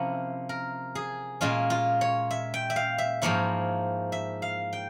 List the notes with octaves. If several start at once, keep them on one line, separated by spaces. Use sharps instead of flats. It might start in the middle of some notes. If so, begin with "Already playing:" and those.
Already playing: C3 F3 A#3 C#4 E4 A#4
A#4
G#4
A#2 G#3 C#4 F4
F4
C#5
E5
G5
E5
F5
E5
G#2 F3 A#3 E4 C#5
E5
F5
G5